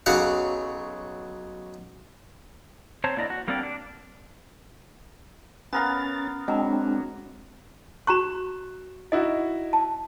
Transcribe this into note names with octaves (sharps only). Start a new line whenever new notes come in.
B1 C#3 F#3 F5 F#5 C#6
C4 C5 C#5 A5 A#5
D3 A#3 E4 D5 D#5 A#5
F#4
G3 A#3 C4 D4 A#4 D5
D4
B3 C#4 A#4 F5 A6
F#3 G#3 C4 D4
F#4 A#5 C#6 F#6 E7
D#4 E4 F#4 D#5
A5